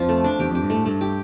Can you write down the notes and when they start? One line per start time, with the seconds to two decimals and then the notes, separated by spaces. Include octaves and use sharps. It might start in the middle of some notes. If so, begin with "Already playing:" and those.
Already playing: F2 F3 F4
0.09 A3
0.24 D4
0.39 E2 G4
0.50 F2
0.55 G4
0.62 G2
0.70 A2 A3
0.85 G2 A3
1.01 G4